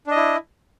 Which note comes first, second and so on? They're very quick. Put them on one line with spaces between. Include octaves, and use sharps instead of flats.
D4 D#5 E4